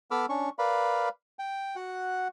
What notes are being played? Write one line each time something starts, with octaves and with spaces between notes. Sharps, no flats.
B3 A4 B5 D6 E6 F6
C#4 D4 C#6
A#4 B4 D5 F5 B5
G5
F#4 F#5